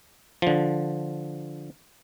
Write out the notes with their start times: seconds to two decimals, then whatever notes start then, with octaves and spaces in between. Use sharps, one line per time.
0.42 D3 F3